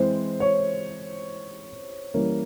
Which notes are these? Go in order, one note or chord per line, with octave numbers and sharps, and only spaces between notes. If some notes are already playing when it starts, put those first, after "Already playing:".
Already playing: E3 G#3 C4 C5
C#5
E3 G3 A#3 C#4